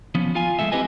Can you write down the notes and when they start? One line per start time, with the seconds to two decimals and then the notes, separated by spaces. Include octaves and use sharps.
0.15 F3 B3 C#4
0.35 F4 F5 G#5
0.59 F3 F#3 G#3 A3 E5
0.72 C4 E4 G4 B4 D#5 G#5